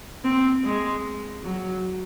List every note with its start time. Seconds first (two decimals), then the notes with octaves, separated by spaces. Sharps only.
0.24 C4
0.64 G#3
1.43 F#3